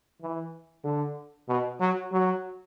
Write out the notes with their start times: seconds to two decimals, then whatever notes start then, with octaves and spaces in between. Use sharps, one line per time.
0.21 E3
0.84 D3
1.48 B2
1.80 F#3
2.12 F#3